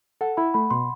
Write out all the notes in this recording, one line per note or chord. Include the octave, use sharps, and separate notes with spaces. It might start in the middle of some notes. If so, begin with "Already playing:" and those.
A4 F#5
E4 B5
A3 B5
B2 C6